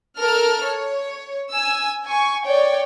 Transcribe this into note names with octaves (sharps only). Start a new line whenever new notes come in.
A4 A#4 F6
C#5
G#5 E6
G#5 C#6
C#5 D5 G5